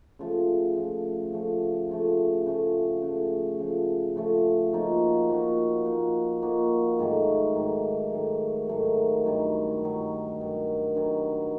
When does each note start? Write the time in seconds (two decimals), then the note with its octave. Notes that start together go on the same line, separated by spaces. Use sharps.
0.19 C#3 F3 A3
0.76 C#3 F3 A3
1.33 C#3 F3 A3
1.90 C#3 F3 A3
2.46 C#3 F3 A3
3.02 C#3 F3 A3
3.59 C#3 F3 A3
4.16 C#3 F3 A3
4.73 F3 A#3 D#4 F#4
5.30 F3 A#3 D#4 F#4
5.85 F3 A#3 D#4 F#4
6.42 F3 A#3 D#4 F#4
6.99 G#2 D#3 F#3 A3
7.55 G#2 D#3 F#3 A3
8.12 G#2 D#3 F#3 A3
8.69 G#2 D#3 F#3 A3
9.25 G2 D#3 F#3
9.82 G2 D#3 F#3
10.39 G2 D#3 F#3
10.95 G2 D#3 F#3